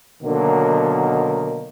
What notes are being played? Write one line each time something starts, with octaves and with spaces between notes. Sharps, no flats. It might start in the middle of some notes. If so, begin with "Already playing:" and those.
B2 D3 D#3 F#3 A#3